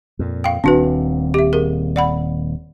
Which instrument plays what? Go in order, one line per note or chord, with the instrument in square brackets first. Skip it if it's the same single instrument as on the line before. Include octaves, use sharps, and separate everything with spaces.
[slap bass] F2 A#2
[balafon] F5 G5
[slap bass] D#1 D#2 C4 [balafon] D4 F#4 B4
[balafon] G4 E5
G#4 A#4
D5 F#5 B5